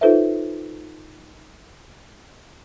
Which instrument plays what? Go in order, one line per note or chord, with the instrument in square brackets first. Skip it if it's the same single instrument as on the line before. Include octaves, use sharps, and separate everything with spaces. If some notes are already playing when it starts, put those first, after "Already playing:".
[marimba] D#4 F4 A4 B4 C5 E5